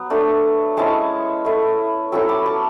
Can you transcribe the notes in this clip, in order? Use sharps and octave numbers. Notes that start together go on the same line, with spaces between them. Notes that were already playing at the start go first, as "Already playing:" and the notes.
Already playing: F#3 B3
A3 D4
G#3 C#4 E4 A5 C#6
A3 E4
F#3 A3 C#4 E4 C#6 E6
B5 D6
A5 C#6